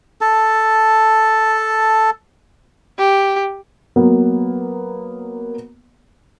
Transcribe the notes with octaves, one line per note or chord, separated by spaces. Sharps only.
A4 A5
G4
F#3 A#3 B3